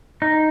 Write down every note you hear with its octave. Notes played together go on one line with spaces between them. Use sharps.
D#4